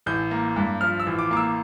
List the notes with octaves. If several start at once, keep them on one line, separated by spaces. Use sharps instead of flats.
A1 G6
A#3
G2
F3 F6
E6
A1
D6
A#3 D6
E6